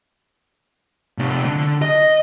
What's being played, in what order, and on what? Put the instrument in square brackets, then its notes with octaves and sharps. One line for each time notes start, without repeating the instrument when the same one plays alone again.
[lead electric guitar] C3 A3
D3
D#5